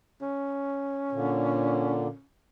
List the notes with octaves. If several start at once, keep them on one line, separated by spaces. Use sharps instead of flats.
C#4
A#2 D3